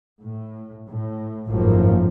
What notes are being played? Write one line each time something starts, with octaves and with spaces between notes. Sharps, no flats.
A2
A2
G#1 F#2 A2 F3 A#3